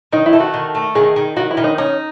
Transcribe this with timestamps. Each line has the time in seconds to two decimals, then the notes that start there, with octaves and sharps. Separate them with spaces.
0.12 D#3 D#4
0.26 E4
0.33 A3
0.40 F#4
0.54 D#3
0.75 A3
0.95 D#3 G#4
1.16 D#3
1.36 D#3 F#4
1.51 E4
1.57 D#3
1.64 D#4
1.78 C#4 D#4